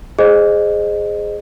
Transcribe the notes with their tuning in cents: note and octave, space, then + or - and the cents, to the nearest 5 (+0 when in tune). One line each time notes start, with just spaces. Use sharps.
G#4 +0 C5 +10 D#5 -20